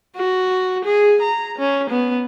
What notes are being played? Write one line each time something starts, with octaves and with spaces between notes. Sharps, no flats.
F#4
G#4
A#5
C#4
B3